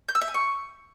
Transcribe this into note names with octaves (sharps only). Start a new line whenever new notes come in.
G6
E6
E5
G#5
C#6